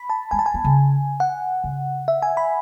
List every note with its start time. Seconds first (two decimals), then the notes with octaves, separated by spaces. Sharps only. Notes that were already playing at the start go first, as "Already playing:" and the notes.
Already playing: B5
0.10 A5
0.31 G#3 G#5
0.39 A5
0.46 G#5
0.54 B3
0.64 C#3
1.20 F#5
1.64 C#3
2.08 E5
2.22 G#5
2.37 B5